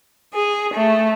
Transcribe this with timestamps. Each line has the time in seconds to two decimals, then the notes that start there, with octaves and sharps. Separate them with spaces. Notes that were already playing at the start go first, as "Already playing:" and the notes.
0.33 G#4
0.73 A3